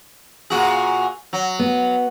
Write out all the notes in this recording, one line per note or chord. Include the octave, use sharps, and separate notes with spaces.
A#2 F#4 G#4
F#3
B3